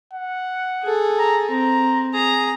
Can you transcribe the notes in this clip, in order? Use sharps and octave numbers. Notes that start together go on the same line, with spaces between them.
F#5
G#4 A4
A#5
C4 A#5
G#4 A#5